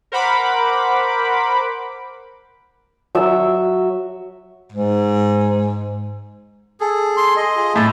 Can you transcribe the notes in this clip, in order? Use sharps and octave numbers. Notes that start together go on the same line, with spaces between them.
A#4 C5 F#5 B5 D6
F#3 E5
G#2
G#4 A4
C6
D#5
F4 G#4
A2 A5